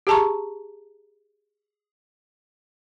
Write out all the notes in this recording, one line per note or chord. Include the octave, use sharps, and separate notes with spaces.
G4 G#4 A5 A#5 C#6